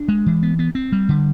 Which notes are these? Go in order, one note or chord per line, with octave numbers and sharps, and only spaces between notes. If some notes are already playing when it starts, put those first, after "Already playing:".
Already playing: D4
G#3
E3
B3
B3
C4
G3
D3